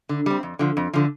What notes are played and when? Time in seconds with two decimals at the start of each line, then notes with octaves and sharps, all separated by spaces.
0.09 D3
0.26 G3 C4
0.43 F2
0.59 D3 F3
0.77 F2
0.94 D3 F3